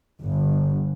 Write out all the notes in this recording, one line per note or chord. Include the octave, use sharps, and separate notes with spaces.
G1